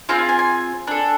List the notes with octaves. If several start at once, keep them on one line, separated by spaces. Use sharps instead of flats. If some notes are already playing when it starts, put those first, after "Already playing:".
C4 F4 G#4 F5
G#5
G#5
G#5
D4 A4